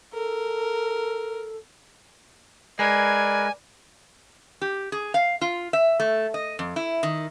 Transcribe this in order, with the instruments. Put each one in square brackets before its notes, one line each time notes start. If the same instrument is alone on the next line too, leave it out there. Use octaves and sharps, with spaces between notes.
[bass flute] A4 [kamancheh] A#4
[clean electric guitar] G#3 [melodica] A#4 B4 [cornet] D5 [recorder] G#5
[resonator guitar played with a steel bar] G4
G#4
F5
F4
E5
A3
D#5
F2
E4
D#3